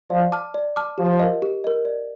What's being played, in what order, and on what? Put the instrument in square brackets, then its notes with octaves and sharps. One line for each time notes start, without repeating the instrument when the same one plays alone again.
[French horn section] F3 [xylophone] D5
[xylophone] A5 D6 F6
D5
A5 D6 F6
[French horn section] F3 [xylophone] G4
[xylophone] A#4 D#5
G4
A#4 D#5
D5